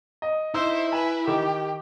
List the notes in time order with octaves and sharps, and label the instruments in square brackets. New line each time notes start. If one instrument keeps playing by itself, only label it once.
[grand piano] D#5
[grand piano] D#4 E6 [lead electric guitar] E4 [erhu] C5
[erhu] B4 [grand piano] G#5
[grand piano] D#3 [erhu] G4